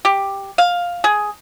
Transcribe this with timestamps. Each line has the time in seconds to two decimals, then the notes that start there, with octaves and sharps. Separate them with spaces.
0.05 G4
0.58 F5
1.04 G#4